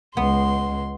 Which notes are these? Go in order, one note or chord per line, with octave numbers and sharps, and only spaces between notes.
C#2 G#3 B3 C6